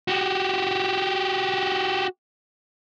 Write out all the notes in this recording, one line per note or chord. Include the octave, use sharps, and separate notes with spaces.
F#4 G4